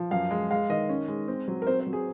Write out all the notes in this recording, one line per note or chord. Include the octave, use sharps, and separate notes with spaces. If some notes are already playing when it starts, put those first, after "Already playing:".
Already playing: F3
F#2 F5
G#3
G#3 F5
D#3 D#5
C#4
G#3
C4
F#3
A#4
C4 C5
C5
F#3
G#4